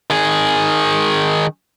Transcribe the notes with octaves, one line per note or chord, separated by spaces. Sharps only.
D#3 G#4